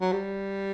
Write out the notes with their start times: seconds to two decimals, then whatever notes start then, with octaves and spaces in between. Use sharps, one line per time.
0.01 F#3
0.12 G3